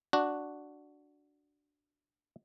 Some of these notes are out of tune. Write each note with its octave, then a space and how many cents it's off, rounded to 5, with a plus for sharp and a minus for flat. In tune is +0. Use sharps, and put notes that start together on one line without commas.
D4 +0 F#4 +0